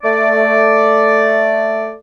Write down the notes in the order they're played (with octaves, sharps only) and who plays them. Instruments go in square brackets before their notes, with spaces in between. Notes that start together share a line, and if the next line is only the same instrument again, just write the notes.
[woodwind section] A3 D5